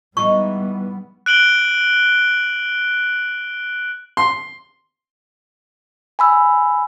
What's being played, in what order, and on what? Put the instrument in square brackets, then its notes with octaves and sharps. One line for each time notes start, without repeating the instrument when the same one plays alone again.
[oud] E3 G#3 D#4 [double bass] G3 B3 [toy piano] C#6
[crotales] F#6 D7 F#7 G7
[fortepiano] C6
[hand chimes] G#5 B5 E6